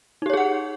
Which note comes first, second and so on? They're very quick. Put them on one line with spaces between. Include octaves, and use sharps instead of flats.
D#4 G4 C#5 G#4 F#5